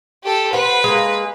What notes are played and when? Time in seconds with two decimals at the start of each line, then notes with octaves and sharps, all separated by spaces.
0.24 G4 A4
0.53 B4 C5 F#5
0.84 G#3 A#3